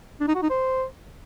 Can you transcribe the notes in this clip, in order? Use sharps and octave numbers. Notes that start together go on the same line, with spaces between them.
D4
D#4
F#4
D#4
C5